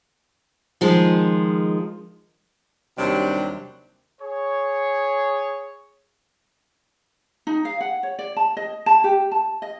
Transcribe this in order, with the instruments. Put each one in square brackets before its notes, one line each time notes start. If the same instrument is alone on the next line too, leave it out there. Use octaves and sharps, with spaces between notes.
[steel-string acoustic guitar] D#3 F3 G#3
[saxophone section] D#2 C3 F#3 G3 D4
[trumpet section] G#4 C#5
[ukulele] D#4
F5
F#5
C#5
D5
A5
D#5
A5
G4
A5
D#5